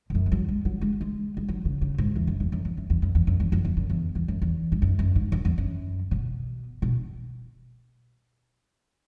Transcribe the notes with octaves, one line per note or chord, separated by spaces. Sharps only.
G#2
F#2
G#3
F#3
G#3
F#3
G#3
G#3
G#3
F#3
C#3
C#3
G#2
E2
F#2
E2
F#2
E2
F#2
E2
F#2
E2
F#2
E2
F#2
E2
F#2
E2
E2
F#2
E2
G#2
F#2
F#2
G#2
F#2
E2
F#2
C#3
B2
B2